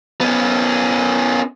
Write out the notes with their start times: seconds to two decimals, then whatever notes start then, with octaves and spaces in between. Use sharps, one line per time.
0.21 B3 C#4